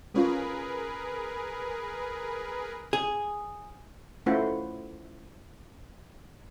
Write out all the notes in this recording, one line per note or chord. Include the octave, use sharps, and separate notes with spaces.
G#3 C#4 F4 G#4 A#4 B4
G#4
A3 C#4 E4 F4 C5 F#5